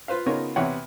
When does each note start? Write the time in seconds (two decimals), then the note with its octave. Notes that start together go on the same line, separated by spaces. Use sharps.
0.08 F4 B4 C5 F5
0.26 C#3 B3 D#4 F4 A#4 C#5
0.56 E2 C3 E3 C#5 F#5 G5